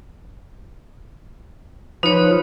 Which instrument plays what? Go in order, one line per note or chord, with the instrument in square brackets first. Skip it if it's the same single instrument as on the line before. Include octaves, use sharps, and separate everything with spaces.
[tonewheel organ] F3 B4 [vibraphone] D#4 C#5